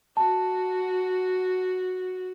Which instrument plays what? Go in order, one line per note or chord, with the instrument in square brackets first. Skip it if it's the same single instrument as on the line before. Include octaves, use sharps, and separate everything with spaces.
[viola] F#4 [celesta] A5